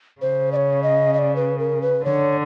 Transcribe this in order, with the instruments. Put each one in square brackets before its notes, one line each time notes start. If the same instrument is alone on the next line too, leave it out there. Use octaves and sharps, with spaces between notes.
[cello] C#3 [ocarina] C5
[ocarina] D5
C#5
D#5
D#5
D5
B4
A#4
B4
[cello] D3 [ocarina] C#5